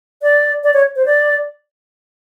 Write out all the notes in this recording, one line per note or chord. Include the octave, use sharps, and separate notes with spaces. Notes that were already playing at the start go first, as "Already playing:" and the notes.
D5
D5
C#5
C5
D5